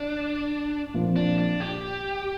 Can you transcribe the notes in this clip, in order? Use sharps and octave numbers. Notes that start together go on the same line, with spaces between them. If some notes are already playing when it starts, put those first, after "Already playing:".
Already playing: D4
A#2 F3 C4 F4
D4
D4
G4